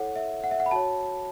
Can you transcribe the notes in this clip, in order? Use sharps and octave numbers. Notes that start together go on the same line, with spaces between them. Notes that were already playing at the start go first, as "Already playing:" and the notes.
Already playing: E4 A4 C#5 F#5
E5
F#5
E5
F#5
B5
F#4 C#5 A5